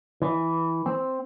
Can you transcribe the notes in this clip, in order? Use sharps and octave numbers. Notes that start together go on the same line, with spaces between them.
E3
C4